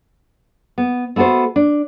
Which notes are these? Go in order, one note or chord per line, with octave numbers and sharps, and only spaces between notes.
B3
A3 B3 F#4 A4 C5
D4